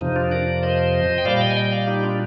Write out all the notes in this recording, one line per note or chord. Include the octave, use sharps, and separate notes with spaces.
F2 C3 F3 D#4
D4 F4
A#4 D5
C5 D#5
G5
A#2 G3 D5 F5
D#5 G5
G#5
D#5 G5
D5 F5
D#4 G4
D4 F4